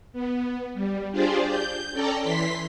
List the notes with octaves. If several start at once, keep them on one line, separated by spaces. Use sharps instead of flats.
B3
G3
D4 F4 G4 G#4 C5 D5
G6
C#4 A4 D5 G5 A5 A#5
E3 C6 B6